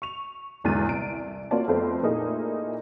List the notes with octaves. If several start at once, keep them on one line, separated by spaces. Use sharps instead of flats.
C#6 F7
B1 E2 G#2 D3 A6 D#7
C2 D7
A#3 F4 F#4 C#5 D5 A5
F2 A3 B3 F4 A4 C5
A#2 A3 A#3 D#4 E4 G#4